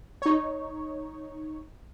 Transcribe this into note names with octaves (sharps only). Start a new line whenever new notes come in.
D#4 C#5